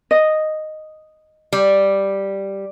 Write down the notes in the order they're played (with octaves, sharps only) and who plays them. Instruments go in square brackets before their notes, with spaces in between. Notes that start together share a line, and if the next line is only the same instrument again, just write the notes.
[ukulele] D#5
[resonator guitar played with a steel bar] G3